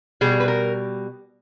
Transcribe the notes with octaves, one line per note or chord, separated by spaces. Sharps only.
B2 G3 G#4
B4
A#4